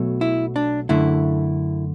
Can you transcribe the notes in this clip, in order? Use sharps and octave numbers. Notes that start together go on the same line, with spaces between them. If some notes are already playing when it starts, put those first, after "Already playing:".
Already playing: B1 B2 F#3 A3
E4
D4
F#2 D3 A3 E4